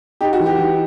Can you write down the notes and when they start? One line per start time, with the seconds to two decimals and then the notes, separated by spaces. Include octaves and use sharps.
0.21 D#4 G4
0.33 F#4
0.40 E3
0.46 G4
0.58 E3